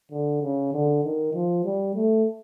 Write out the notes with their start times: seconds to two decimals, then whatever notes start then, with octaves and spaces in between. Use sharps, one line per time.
0.11 D3
0.42 C#3
0.73 D3
1.04 D#3
1.34 F3
1.65 G3
1.95 A3